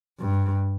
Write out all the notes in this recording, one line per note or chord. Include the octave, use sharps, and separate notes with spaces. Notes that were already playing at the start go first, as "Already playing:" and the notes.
G2